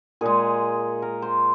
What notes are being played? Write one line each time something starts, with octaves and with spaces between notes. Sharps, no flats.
A#2 G#3 G#4
A#4
C5